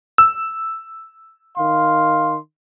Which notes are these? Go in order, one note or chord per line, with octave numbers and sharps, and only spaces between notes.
E6
D#3 F5 C6